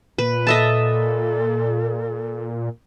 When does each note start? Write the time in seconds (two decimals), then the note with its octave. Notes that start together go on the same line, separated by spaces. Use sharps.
0.18 A#2 B4
0.47 A4 D#5 E5 A5